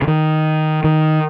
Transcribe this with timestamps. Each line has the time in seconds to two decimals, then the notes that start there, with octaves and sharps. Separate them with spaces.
0.02 C#3
0.07 D#3
0.84 D#3